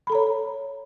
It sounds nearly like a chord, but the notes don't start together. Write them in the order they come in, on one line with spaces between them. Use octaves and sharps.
B5 A4 A#5 C#5